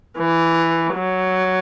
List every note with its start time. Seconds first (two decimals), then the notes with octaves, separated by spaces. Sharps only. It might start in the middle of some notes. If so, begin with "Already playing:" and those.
0.19 E3
0.95 F#3